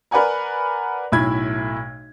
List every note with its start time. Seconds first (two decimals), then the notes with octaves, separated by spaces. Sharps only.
0.11 A#4 B4 D5 F#5 G#5 A#5
1.12 B1 A2 E4 B5 G#6